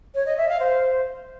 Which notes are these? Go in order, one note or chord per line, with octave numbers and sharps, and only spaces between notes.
C#5
D#5
E5
F5
C5